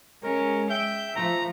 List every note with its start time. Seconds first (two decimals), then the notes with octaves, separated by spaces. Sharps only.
0.23 G#3 C#4 A#4
0.70 E5 G5 G6
1.16 F3 A3 A#5